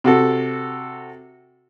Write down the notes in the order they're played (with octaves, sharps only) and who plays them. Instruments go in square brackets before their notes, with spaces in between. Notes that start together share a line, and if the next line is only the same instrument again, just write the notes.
[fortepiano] C3 F#4 A4